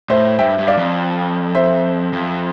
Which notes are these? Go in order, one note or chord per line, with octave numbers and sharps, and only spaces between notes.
A2 C5 E5
G2 E5 G5
G2
D5 F5
F2
C5 E5
F2